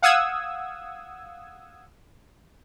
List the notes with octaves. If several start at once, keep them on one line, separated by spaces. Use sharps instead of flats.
F5 F#5 D#6 E6 G#6